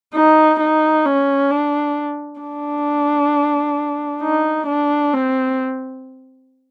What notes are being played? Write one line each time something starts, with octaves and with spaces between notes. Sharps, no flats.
D#4
D#4
C#4
D4
D4
D#4
D4
C4